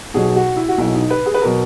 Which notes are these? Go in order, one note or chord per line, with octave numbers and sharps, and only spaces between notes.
B1 B2 F#3 G#4
F#4
E4
F#4
B1 B2 F#3 E4
D#4
B4
G#4
B4
B2 F#3 A#4